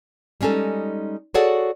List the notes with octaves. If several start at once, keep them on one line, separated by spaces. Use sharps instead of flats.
G3 G#3 C#4 D#4 A4
F#4 G#4 A4 C#5 D5 F#5